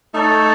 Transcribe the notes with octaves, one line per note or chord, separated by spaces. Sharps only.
A3 D#4 A4 C#5